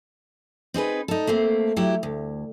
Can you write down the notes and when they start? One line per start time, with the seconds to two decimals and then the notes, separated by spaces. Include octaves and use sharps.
0.74 C4 D#4 G#4 B4
1.08 D#4 A4
1.27 A3 A#3 C4
1.77 F#3 E4 G4
2.03 D2